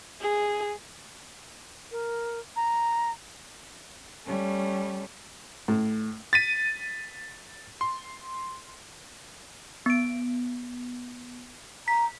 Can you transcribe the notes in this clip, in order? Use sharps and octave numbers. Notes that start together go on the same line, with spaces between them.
G#4
A#4
A#5
G3 A3 C#4
A2
A6 B6 D#7
C6
B3 D7
A#5 B6